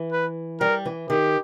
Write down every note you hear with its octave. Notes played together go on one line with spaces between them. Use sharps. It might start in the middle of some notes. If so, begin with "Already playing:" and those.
Already playing: E3
B4
G3 A#4
E3
D#3 G4